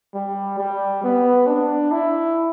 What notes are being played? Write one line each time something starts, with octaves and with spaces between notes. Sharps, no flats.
G3
G3
B3
D4
E4